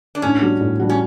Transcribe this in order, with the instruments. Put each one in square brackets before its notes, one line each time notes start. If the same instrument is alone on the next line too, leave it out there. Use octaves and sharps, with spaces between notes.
[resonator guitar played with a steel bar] D4
[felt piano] A2 [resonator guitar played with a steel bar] C#4
[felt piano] G3 D4 F#4
A2
G3 D4 F#4
[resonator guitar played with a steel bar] C#4